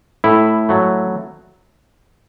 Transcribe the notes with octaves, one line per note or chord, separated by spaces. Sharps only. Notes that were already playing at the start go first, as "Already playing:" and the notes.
A2 E4
F#3 A3